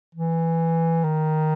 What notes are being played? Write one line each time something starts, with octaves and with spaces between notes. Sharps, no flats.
E3
D#3